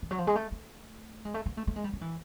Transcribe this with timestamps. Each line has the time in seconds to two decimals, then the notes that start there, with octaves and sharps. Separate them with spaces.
0.02 E3
0.11 F#3
0.18 F3
0.27 G#3
0.35 A3
0.52 A3
1.25 G#3
1.34 A3
1.46 A#3
1.57 A3
1.67 A3
1.76 G#3
1.84 G3
1.93 F#3
2.01 E3